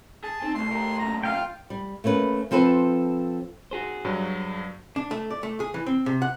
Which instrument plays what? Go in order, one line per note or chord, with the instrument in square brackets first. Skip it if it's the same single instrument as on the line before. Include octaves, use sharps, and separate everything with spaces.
[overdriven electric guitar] G#4 [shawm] A5
[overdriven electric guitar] C4 [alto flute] D#4
[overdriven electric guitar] C2 G#2 [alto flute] A3 [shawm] C6
[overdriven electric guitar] G4 A#4
[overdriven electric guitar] F#2 A#2 [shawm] A#5
[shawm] F4 [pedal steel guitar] F5 G5
[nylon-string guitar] G3
A3 A#3 C#4 B4
F3 C4 A4 B4 C5
[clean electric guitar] F#4 G#4 C5
[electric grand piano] G2 F#3
[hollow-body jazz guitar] D4
A3
D5
A3
G#4
E3
C4
C3
F#5